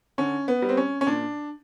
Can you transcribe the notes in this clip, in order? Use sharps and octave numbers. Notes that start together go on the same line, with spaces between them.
D3 C#4
B3
G3
C4
C#4
C#4
A#2 D4